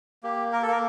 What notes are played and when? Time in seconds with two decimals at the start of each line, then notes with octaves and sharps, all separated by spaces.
0.23 A#3 G4
0.53 A#4
0.62 A4
0.68 A#3 A#4